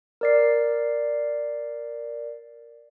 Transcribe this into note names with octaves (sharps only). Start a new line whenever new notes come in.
A#4 D5 C7